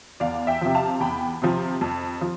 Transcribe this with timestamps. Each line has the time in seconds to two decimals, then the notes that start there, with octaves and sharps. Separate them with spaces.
0.20 E2 D5 F5
0.47 E5 G5
0.61 C3 F3
0.74 F5 A5
1.00 E2 G5 B5
1.42 C3 F3
1.81 F2
2.21 F3